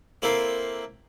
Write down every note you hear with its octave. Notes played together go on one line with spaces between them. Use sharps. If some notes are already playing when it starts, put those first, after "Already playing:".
A#3 C4 E4 A4 C5